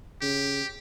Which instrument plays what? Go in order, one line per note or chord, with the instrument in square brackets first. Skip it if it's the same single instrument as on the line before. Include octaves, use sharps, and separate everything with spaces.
[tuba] C#3 [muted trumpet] G4